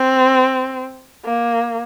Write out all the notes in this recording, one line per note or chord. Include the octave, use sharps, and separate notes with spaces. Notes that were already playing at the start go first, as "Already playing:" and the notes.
Already playing: C4
A#3